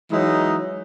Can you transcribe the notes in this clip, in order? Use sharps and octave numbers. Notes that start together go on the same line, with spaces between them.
E3 F#3 G#3 D#4